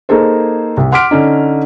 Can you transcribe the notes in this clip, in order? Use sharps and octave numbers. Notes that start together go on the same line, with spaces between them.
A#3 D#4 G#4 A4 C5
C2
F#5 C6 D6 F6 B6 D7
D3 C#4 D#4